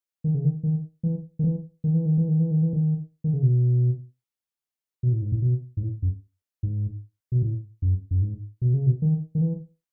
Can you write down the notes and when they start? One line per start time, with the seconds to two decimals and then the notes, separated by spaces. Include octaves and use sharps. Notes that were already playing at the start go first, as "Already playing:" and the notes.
0.24 D#3
0.35 C#3
0.44 D#3
0.63 D#3
1.03 E3
1.39 D#3
1.44 E3
1.84 D#3
1.94 E3
2.06 D#3
2.17 E3
2.28 D#3
2.39 E3
2.51 D#3
2.62 E3
2.73 D#3
3.24 D#3
3.33 C#3
3.43 B2
5.03 B2
5.13 A2
5.22 G#2
5.32 A2
5.42 B2
5.77 G#2
5.83 A2
6.02 F#2
6.63 G#2
7.32 B2
7.42 A2
7.82 F#2
8.11 F#2
8.22 G#2
8.62 B2
8.74 C#3
8.86 B2
9.02 D#3
9.35 D#3
9.41 E3